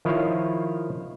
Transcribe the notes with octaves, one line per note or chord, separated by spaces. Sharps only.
D#3 F3 E4 F4 C#5